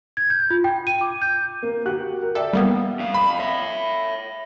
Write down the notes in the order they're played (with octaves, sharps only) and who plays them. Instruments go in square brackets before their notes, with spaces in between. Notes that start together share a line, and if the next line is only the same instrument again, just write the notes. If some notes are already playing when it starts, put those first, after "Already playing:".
[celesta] G#6
G6
F4
G5
D#7
D6
G6
[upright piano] A#3
F#4 G4 F#6
A#4
[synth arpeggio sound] A4 [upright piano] D5 E5 G5
[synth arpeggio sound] G3 A#3 B3
[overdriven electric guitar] F2 F5
[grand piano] B5
[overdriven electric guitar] C#5 E5